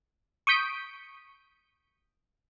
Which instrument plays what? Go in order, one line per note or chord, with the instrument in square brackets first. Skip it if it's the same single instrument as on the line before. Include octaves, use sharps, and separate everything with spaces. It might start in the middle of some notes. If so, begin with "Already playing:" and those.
[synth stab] C#6 D#6 G6 B6 D7